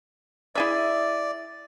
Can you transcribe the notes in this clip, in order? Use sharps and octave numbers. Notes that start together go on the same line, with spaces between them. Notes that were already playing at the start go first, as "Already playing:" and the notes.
E4 G#4 D5 E5